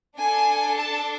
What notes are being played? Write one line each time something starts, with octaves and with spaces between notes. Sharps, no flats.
D4 A4 G#5
A5